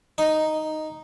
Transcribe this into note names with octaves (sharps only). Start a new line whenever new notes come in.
D#4